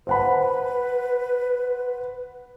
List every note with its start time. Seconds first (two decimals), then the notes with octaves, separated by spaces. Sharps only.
0.07 B4 C5 F#5 B5